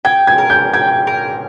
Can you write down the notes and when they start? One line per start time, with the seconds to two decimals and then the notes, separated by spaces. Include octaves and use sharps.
0.05 G5 G#6
0.27 G#6
0.38 A#4
0.50 G6
0.73 G5 G#6
1.07 A#4